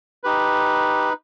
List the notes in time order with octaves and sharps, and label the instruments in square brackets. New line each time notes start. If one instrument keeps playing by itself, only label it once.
[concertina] D#4 G4 B4